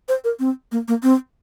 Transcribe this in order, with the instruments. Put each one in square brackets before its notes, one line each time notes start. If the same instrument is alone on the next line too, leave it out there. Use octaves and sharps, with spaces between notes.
[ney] C5
A#4
C4
A#3
A#3
C4